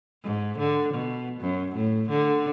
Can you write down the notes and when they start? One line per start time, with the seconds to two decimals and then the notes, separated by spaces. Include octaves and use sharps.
0.23 G#2
0.59 D3
0.94 B2
1.40 F#2
1.76 A2
2.09 D3